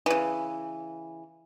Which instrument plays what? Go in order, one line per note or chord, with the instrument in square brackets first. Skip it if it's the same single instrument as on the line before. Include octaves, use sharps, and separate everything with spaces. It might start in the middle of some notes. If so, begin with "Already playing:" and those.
[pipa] C#3 E3